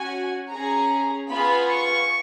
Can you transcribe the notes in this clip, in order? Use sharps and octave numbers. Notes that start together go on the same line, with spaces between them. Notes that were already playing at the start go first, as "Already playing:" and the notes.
Already playing: C#4 F#4 G#5
C#4 G#4 A#5
B3 F4 G#4 B5
C#6